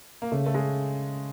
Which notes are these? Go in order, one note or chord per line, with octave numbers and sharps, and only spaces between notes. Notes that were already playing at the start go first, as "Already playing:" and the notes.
A#3
C#3 A3
A3
G#3